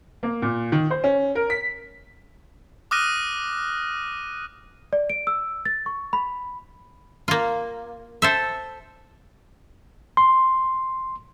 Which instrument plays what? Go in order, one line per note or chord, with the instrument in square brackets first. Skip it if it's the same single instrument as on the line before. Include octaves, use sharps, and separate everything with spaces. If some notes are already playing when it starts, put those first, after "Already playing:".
[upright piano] A#3
A#2
D#3
C5
C#4
A#4
B6
[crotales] D6 D#6 F6 F#6 A#6 D#7
[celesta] D5
D7
E6
A6
C#6
B5
[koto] A#3 F4
A4 C5 E5
[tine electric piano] C6